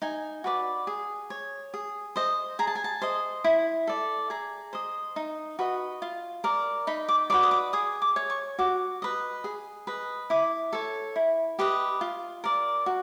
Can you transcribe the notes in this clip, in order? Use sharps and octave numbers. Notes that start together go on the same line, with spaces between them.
D#4 G#5
F#4 B4 D5
G#4
C#5
G#4
C5 D#5
G#4 A#5
A5
G#5
A5
C5 D#5
E4
A4 D5
G#4 A#5
C5 D#5
D#4
F#4 B4 D#5
F4
A#4 D5
D#4 B5
D6
F#4 B4 D5 D6
D#6
D6
G#4 D#6
D6
C#5
C#6
F#4 D6
B4 D#5
G#4
B4 D#5
E4 D6
A4 C#5
E4
G4 B4 D#5
F4
A#4 D5
F#4